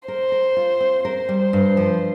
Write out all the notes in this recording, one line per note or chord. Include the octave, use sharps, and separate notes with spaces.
A#4 C5
A#4
F4
C4
A#4 C5
G3
G2
F3